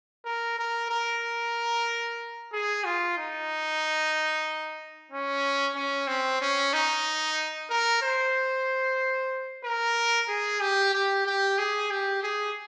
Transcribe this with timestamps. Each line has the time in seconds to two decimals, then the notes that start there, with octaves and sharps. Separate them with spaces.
0.25 A#4
0.59 A#4
0.90 A#4
2.53 G#4
2.84 F4
3.17 D#4
5.11 C#4
5.75 C#4
6.07 C4
6.41 C#4
6.73 D#4
7.70 A#4
8.02 C5
9.64 A#4
10.29 G#4
10.60 G4
10.93 G4
11.26 G4
11.58 G#4
11.90 G4
12.23 G#4